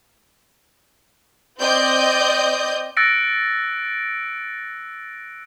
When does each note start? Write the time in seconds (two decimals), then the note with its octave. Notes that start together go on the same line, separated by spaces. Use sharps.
1.60 C4 D5 D#5 G6
2.97 E6 F#6 A6 A#6 C#7 D7